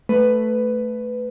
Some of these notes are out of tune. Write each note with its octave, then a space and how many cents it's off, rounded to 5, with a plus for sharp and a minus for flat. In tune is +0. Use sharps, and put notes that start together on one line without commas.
A3 +0 B4 +10